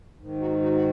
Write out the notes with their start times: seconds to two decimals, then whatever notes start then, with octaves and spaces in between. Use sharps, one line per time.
0.18 G#2 D#3
0.40 D#4 F#4
0.62 D#4 F#4
0.75 F#4